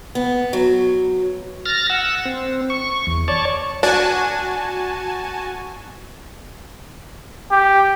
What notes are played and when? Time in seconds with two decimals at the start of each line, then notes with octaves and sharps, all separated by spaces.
0.15 B3
0.53 F#3
1.66 F6 A6 A#6
1.90 F#5 E6
2.25 C4
2.70 C#6
3.07 E2
3.28 C#5 D5 A5 C#6
3.83 D4 F#4 G#5 A5
7.51 G4